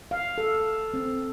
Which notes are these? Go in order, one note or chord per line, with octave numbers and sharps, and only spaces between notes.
F5
A4
C4